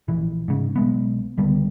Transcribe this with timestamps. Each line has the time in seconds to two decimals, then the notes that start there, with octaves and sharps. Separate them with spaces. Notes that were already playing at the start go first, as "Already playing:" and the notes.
0.08 A#1 E3
0.48 G#2 C#3
0.76 B1 G#3 B3
1.37 C#2 D3 G3 B3